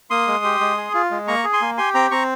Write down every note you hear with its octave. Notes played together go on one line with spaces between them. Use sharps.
A#3 C6 D#6
G#3
G4
G#3
G#4
F4
G#3
A#3 A#5 C#6
G#4
G#5 C6
A#3
G4 G#5 C6
C4 G5 A#5
C4 A#5 C#6